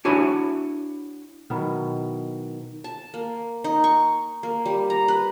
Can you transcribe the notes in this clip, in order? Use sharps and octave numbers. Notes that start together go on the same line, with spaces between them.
D4 E4 F#4 C#5 G#5 B5
B2 D#3 F#3 E4
A5
A#3
D#4
C#6
A#3
G3
A#5
B4